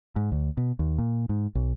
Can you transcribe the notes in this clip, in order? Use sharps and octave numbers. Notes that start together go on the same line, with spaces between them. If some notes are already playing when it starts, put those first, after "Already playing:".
G#2
D2
B2
D#2
A#2
G#2
B1